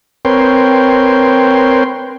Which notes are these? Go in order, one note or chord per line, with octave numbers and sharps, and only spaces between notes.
C4 A#4 B4 C#5 G5 C6